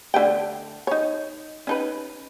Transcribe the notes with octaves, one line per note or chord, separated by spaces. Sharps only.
D3 A3 G5
D#4 C#5
C#4 D#4 B4